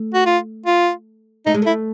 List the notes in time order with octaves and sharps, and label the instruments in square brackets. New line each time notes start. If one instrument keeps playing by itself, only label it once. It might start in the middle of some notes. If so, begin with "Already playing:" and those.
Already playing: [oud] A3
[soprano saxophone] F#4
F4
F4
[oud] A3 [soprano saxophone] D#4
[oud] G#3
[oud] A3 [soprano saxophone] E4